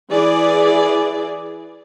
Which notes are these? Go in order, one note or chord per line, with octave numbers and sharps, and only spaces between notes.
E3 G#4 D5